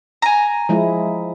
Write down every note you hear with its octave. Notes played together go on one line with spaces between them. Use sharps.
G#5 A#5
F3 G#3 E4